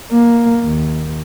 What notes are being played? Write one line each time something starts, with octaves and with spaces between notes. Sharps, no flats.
A#3
D#2